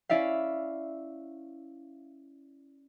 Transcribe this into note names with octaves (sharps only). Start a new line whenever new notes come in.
C#4 E4 D5 E5 F5